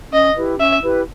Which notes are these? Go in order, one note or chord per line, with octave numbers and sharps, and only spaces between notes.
C#4 D#5
E4 G4 B4
C#4 E5
E4 G4 B4